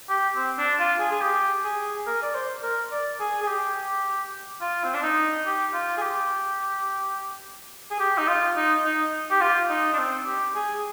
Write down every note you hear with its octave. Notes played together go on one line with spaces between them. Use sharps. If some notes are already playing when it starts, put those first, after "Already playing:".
G4
C4
D4
F4
G#4
G#4
G4
G#4
A#4
D5
C5
A#4
D5
G#4
G#4
G4
F4
C4
D4
D#4
G4
F4
G#4
G4
G#4
G4
D#4
F4
D#4
D#4
G4
F4
D#4
D4
C4
G4
G#4